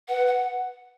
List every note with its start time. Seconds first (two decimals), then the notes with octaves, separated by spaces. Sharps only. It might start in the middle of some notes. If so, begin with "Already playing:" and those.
0.08 B4 F#5
0.27 F#5